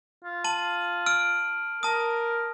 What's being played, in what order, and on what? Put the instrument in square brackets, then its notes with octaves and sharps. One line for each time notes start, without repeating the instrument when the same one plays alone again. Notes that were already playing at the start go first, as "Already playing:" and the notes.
[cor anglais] F4
[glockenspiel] A5 D#7 F#7
E6 F6 D7
[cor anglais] A#4 [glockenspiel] A5 D#6